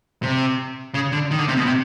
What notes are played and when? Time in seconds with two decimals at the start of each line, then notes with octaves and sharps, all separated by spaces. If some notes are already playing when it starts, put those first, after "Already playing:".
0.23 C3
0.94 C#3
1.12 D3
1.31 D#3
1.39 D3
1.48 C3
1.57 B2
1.66 C3